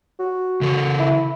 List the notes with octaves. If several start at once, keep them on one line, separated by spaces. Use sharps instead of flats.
F#4
C#3 A4
E4